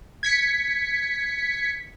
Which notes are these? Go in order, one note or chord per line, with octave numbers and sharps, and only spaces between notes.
G#6 B6 C#7